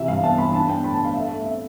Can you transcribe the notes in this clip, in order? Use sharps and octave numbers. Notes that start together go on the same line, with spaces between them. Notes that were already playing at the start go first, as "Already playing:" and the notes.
Already playing: C3 E3 E5
G2 F5
B3 A5
E3 B5
D4 A5
B3 G5
A2 B5
A5
D4 F5
A3 E5
A3
C4 E5